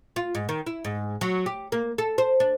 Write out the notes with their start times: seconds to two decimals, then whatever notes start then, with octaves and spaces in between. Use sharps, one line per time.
0.16 F4
0.35 G#2
0.49 D#3
0.67 E4
0.85 G#2
1.21 F#3
1.46 G4
1.72 A#3
1.98 A4
2.18 C5
2.40 D4